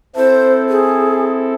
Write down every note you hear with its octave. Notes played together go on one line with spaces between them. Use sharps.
C4 E4 A4 C5
G#4